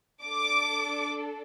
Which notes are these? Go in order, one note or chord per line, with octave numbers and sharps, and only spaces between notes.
D4 A4 D6